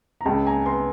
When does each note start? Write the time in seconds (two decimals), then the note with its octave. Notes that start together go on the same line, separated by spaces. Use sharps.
0.21 A#5
0.25 C#2 G5 A5
0.47 G#5 A#5
0.65 B3 A#5 C6